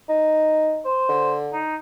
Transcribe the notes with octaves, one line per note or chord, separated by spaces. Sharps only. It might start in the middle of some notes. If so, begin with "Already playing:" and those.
D#4
C5
D3
D#4